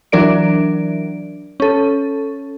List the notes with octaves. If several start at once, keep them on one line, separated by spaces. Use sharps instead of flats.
E3 F#3 D4 A#4 D5 D7
C#4 A4